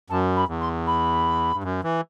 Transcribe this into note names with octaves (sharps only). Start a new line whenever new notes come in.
F#2 A5
B5
E2
C6
B5
G2
F#2
E3